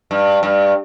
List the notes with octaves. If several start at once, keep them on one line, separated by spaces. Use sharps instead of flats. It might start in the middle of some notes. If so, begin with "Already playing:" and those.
G2
G2